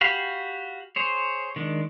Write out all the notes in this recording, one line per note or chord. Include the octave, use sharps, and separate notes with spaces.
F#4 G4 F5 B5
G#4 C5 C#5
D#3 G#3 D4